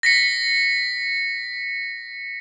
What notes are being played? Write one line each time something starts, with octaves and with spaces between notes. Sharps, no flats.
A#6 B6 C#7